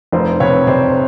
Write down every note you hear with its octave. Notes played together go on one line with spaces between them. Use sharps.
F1 C5 D5
C3 B4 C#5
C3 C5 D5